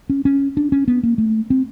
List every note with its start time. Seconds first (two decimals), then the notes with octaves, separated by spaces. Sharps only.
0.10 C#4
0.25 C#4
0.57 D4
0.72 C#4
0.88 B3
1.03 A#3
1.18 A3
1.50 C4